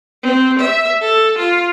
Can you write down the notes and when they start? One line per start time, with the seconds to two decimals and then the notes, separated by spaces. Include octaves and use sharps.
0.23 C4
0.59 E5
1.01 A4
1.38 F4